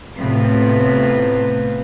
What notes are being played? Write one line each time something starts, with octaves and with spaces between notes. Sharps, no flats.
A2 C3 B3 C4 F4 B4